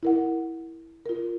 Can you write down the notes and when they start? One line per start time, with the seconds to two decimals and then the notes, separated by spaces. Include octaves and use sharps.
0.03 E4 A#4 F#5
1.06 F4 A#4